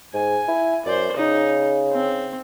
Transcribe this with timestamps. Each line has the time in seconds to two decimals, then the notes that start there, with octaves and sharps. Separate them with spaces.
0.14 G#2 G#5
0.48 E4
0.85 F#2 C5 D5
1.17 C#3 D#4
1.93 C4